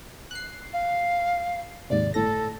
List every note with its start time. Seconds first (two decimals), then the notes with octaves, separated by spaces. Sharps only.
0.31 F#6 C7
0.73 F5
1.90 D#2 G#2 C3 D5
2.14 G1 A2 A4 A#6